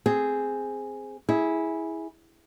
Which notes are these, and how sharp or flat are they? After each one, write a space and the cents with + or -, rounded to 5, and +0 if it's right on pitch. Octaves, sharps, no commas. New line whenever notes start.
C4 +0 G#4 +0
E4 -15 G#4 +0